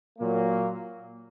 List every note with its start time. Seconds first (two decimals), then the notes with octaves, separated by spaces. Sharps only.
0.19 A#2 F#3 A#3